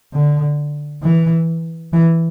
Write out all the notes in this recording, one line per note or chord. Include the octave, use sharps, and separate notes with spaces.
D3
E3
E3